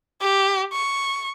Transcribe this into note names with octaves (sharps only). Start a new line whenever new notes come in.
G4
C#6